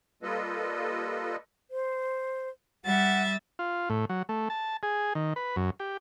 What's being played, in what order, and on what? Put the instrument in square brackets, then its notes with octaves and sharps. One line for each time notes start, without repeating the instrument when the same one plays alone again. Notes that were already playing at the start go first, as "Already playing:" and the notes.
[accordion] G3 A#3 F4 A4 B4 D#5
[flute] C5
[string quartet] G3 E5 A6 [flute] F#5
[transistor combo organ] F4
A2
F#3
A3
A5
G#4
D#3
B4
F#2
G4